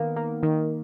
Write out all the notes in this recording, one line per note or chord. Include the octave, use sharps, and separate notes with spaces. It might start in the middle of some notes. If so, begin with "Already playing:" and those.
Already playing: D#3 A#3 B3
A#3
D#3